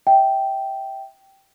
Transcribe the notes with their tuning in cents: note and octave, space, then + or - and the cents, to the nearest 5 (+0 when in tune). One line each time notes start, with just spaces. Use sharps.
E5 -15 G5 -10